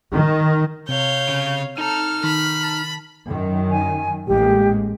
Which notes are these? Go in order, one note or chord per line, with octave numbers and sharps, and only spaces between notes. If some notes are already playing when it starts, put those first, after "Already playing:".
D#3
C3 C#5 F5 G6
C#3
D#4 A4 A#5 F6
D#3 B5
A5
F#2 D#3
G#5
A1 G#3 A#3 G4